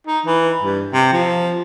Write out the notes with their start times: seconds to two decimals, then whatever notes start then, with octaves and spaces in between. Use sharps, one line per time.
0.07 D#4
0.26 E3
0.62 G2
0.93 C3
1.12 F3